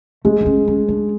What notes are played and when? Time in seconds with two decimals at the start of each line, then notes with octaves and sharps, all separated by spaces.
0.25 G#3 A3
0.41 D4
0.46 C#4
0.68 C#4
0.88 D4